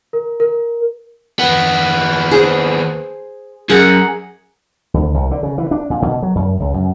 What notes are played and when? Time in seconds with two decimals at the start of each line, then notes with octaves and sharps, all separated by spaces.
0.13 A#4
0.40 A#4
1.39 D#2 B3
2.31 G#4 C5
3.69 F#2 G#4 A#4 F#5
4.94 D2
5.14 C2
5.31 D3
5.43 C#3
5.58 E3
5.71 D4
5.90 A#2
6.02 B2
6.22 F#3
6.35 F#2
6.60 C#2
6.74 F#2